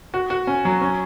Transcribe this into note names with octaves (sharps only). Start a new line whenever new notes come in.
F#4
F#4
C#4
F#3
C#4